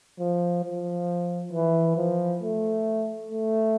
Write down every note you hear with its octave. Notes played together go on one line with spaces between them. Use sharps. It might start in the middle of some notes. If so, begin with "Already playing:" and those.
F3
F3
E3
F3
A3
A3